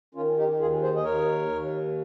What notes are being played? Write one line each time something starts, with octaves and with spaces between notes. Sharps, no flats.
D#3 C#4 F4
D#4 G4
D#2 F4 G#4
G#4 C5
D#5
D#2 A#4 C#5
D#2